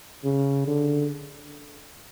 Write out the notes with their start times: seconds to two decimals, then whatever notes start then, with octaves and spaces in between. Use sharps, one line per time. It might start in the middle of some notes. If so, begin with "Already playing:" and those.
0.24 C#3
0.67 D3